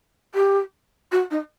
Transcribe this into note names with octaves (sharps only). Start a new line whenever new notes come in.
G4
F#4
D#4